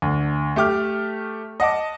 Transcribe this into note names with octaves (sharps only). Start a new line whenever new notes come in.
D2
A3 G4 D6 F6
D#5 F#5 A5 D6